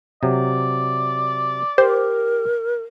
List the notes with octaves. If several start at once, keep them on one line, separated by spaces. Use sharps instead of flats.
C3 F#3 D5
G4 A#4 C5